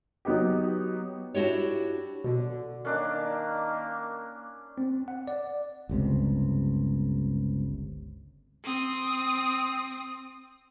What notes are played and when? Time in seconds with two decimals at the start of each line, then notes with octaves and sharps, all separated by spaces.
0.25 F#3 B3 D#4 G4
1.34 D4 E4 F#4 G4 C#5
2.24 B2 D3
2.85 D#3 A#3 C#4 D4 D6
4.78 C4
5.08 F#5
5.27 D5
5.89 G1 C#2 C3
8.64 C4 D#6